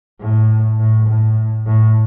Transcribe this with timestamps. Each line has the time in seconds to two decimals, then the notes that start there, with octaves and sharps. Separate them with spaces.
0.21 A2
0.80 A2
1.08 A2
1.67 A2